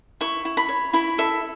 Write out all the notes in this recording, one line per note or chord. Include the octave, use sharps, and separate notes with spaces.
E4 C#6
E4
B5
C#5
E4 B5
A4 E5